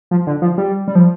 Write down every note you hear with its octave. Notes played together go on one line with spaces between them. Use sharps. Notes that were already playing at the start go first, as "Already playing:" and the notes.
F3
D3
F3
G3
G3
F3